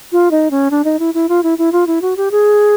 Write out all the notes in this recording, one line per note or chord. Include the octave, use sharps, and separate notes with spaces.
F4
D#4
C#4
D4
D#4
E4
E4
F4
E4
E4
F4
E4
F#4
G4
G#4